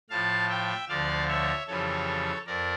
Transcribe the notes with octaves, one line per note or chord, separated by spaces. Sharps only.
A2 F3 F5 A5
E5 G5
D2 D3 F3 D5 F5
C#5 E5
F2 C#3 E3 G3 A4 C#5
F2 A#4 D5